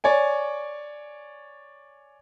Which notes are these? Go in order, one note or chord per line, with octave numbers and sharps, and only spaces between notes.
C#5 D5 G#5